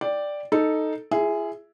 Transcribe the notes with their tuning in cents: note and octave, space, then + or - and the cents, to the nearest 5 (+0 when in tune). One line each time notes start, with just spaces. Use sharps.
D5 +0 G5 +0
D#4 +0 A4 +0
F4 -45 G#4 +0 E5 +0